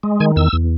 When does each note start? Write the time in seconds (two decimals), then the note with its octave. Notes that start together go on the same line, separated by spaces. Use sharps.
0.03 G#3
0.20 D#3 G#5
0.36 E2 E6
0.53 E2